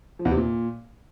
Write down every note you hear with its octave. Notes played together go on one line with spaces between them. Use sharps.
F3
E2
C3
A#2